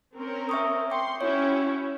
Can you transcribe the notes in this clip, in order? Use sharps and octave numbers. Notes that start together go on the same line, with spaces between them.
C4 C#4 A#4
E5 C#6 D#6
G5 C6 D6
C#4 E4 F#4 C#5